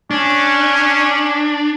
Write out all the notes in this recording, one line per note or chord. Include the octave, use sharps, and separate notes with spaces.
C#4 D4